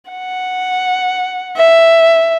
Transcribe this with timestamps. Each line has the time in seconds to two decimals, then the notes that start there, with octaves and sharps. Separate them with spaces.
0.11 F#5
1.57 E5